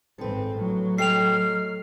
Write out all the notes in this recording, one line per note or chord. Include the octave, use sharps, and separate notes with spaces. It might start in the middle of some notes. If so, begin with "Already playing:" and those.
G#1 C4 A4 B4
A2 F#3
A4 D#5 G5 F6 C7 F7